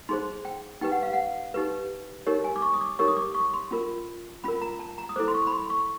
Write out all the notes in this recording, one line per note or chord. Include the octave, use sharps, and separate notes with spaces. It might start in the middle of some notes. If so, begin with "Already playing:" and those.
D#4 G#4 C5 C6
G5
D#4 G4 B4 G5
F#5
F5
F#5
D#4 G4 B4
D#4 G4 A#4 C#5
G#5
D6
C#6
D#6
D6
D#4 G4 A#4 C#5 C#6
D#6
D6
C#6
C6
C#4 F4 A#4
C#4 F4 A#4 B5
A#5
A5
A#5
D#6
E4 A4 C5 D6
C6
C#6
B5
C6
C#6